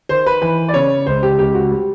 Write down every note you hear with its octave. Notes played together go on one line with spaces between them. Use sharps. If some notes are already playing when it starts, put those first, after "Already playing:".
D#3 C5
B4
E3 B4
D5
C#3 C#5
C#2 C5
G4
C#2 G4
F#4
G3